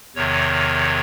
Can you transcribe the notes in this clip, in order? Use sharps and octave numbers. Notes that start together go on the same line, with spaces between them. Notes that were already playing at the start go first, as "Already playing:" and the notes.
E2 C3 D#3 C#5